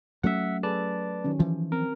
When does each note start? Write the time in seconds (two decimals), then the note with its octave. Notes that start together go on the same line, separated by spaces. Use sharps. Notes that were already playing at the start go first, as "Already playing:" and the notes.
0.23 F#3 A3 C#4 E5 F#5
0.63 G#4 A4 B4 D5 A5
1.24 D#3 F#3 C#4
1.39 E3 F3 D#4
1.72 C4 A#4